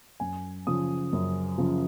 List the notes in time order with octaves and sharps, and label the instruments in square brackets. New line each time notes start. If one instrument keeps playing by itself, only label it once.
[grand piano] F#2 G#5
C#3 F3 D#6
F#2
C#3 F3